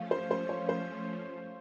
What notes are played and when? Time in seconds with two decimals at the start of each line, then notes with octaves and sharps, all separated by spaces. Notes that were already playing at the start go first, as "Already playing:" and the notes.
Already playing: F3 A3 C#4 F5
0.11 C5
0.31 C5
0.49 C#5
0.69 C5